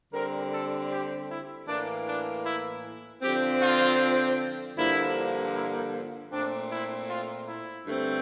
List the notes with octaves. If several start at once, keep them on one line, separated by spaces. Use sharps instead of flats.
D3 G3 C4 A#4
A4
G4
E4
A2 E3 A#3 D4
D4
E4
D3 F3 C4 G4
F4
G2 D3 F3 A#3 E4
E4
A#2 A3 C4 D4
E4
F4
E4
G2 D3 A3 C4